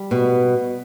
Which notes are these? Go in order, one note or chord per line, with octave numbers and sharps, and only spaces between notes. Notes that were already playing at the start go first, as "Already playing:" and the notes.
Already playing: G3
B2